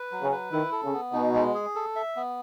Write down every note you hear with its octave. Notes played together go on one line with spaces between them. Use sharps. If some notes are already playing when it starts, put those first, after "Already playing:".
Already playing: B4
F#3
C#3
B4
D#3 E4
A4
C#3
B3
B2 D#4
G#3
G#4
A4
E5
B3